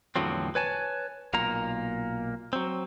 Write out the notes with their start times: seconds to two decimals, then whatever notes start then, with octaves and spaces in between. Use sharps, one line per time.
0.16 E2 A2 D3 F3 F#3 C4
0.55 B4 C#5 G#5 A5
1.34 B1 A#2 A#3 A#5
2.53 F#3 C4